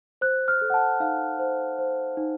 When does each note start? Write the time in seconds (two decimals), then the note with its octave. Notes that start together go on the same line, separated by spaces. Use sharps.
0.21 C5 F#6
0.48 F6
0.61 A4
0.70 F#5
0.74 A5
1.00 D#4 F5
1.39 C5
1.78 C5
2.17 D#4